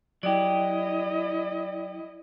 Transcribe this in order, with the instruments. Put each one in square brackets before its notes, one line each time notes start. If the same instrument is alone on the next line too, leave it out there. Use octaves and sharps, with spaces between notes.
[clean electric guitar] F#3 G4 [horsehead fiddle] E4 D#5 [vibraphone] D5